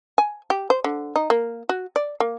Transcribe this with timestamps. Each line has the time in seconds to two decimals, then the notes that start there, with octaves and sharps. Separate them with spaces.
0.18 G#5
0.50 G4
0.70 C5
0.84 D3
1.16 D#4
1.30 A#3
1.69 F#4
1.96 D5
2.20 A#3